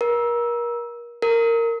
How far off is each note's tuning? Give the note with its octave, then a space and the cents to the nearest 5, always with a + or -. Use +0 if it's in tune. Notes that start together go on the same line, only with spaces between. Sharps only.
A#4 +30
A#4 -15